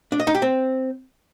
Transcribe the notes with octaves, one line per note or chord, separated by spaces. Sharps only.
D4
D#5
D#4
G4
C4